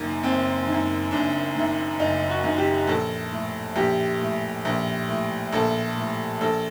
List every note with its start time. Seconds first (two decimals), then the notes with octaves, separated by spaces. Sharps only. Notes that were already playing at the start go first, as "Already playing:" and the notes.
Already playing: F#1 F#2 D#3 A#3
0.23 F#1 C4
0.67 D#3
0.72 F#2
1.11 F#1 D4
1.56 F#2 D#3
1.99 F#1 D#4
2.30 F#4
2.44 F#2 D#3
2.58 G4
2.87 A#1 A4
3.32 A2
3.76 A#1 G4
4.21 A2
4.65 A#1
5.09 A2
5.53 A#1 A4
5.97 A2
6.41 A#1 A4